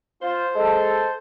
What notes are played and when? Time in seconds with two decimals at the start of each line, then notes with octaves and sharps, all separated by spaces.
0.22 F4 C5
0.56 G#3 A4